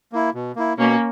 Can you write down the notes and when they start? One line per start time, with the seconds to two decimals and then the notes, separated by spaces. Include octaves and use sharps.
0.12 A#3 E4
0.34 B2
0.56 A#3 E4
0.78 B2 A#3 C#4